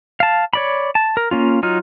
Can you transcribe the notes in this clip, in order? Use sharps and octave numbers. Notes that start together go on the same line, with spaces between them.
F5 A5
C#5 D5 B5
A5
A#4
A#3 C#4 F4
F#3 D#4 F4 F6